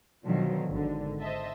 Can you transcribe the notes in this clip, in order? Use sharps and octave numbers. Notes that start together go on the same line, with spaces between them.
B2 D3 D#3 F3 F#3
G#1 D3
C5 D#5 E5 A5